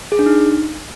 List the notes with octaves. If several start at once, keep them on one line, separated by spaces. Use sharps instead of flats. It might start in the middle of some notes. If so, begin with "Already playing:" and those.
G#4
D4
D#4